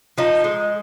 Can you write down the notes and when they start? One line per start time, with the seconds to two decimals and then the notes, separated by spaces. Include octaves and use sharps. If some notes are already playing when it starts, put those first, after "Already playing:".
0.18 F3 D#4
0.44 G#3